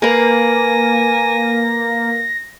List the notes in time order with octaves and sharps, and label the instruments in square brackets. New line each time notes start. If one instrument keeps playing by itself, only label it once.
[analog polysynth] A#3 [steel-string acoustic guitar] A#4 B4 [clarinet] G#5 [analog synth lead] A#6